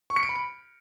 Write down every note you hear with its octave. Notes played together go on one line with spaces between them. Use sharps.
C#6
C#7
D7
B5
D7